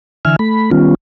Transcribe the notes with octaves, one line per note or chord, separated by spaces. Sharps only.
D3 E3 E5 G#5 F6
A3 B5
D#3 G3 B3 C#4 F4